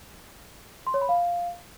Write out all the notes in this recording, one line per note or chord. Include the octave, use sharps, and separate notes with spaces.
C6
C#5
B5
F5